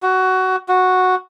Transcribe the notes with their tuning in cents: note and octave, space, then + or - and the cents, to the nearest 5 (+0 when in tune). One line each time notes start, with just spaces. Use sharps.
F#4 +15
F#4 -5